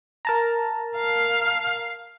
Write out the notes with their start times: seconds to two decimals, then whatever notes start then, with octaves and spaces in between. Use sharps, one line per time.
0.25 A#4 A5 A#5
0.97 F5